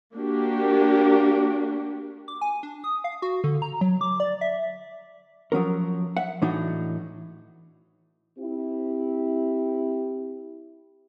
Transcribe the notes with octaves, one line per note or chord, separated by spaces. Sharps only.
A#3 D4 F#4 G4
D6
G#5
D4
D#6
F5
F#4
D3
A#5
F#3
D6
D5
E5
F3 F#3 C#4 A#4
E5 F#5
A2 E3 D4 D#4 F#4
C4 E4 G4